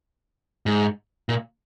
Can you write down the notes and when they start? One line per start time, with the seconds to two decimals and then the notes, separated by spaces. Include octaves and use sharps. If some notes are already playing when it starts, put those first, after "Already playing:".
0.66 G#2
1.29 A#2